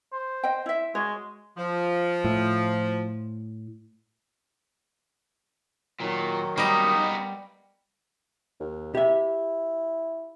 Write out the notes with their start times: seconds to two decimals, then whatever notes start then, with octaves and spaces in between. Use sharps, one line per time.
0.13 C5
0.43 D#5 G5
0.66 E4 E5
0.95 G#3 F#4 C#5
1.57 F3
2.25 A2
6.00 A#2 D#3 F#3
6.58 G3 A#3 B3 D#4 D#5
8.60 D#2
8.95 E4 G4 E5